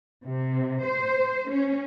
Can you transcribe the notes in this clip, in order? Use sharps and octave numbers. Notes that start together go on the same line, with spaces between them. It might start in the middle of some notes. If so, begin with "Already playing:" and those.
C3
C5
C#4